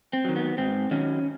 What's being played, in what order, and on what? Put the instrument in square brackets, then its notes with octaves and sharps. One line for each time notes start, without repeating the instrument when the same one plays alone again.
[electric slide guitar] C4
D#3 F#3
B3
G#2 C4
D#3 F#3 C#4